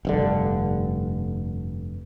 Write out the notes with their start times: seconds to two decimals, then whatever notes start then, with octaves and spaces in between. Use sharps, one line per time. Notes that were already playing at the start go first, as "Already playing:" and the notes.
0.05 F1 G2 D3